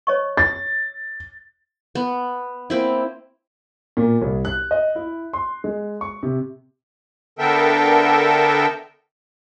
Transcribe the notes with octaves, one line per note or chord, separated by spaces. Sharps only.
C#5 D#5 C#6
A6
B3
A#3 C4 E4
A#2
C2
F#6
D#5
E4
C6
G#3
C#6
C3
D3 B3 A4 A#4 E5 G5